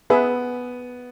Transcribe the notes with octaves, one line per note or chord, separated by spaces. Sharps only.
B3 G#4 B4 E5